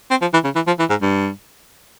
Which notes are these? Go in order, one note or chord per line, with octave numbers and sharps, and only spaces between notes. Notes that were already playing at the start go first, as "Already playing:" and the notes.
C4
F3
E3
C#3
E3
F3
E3
G#2
G2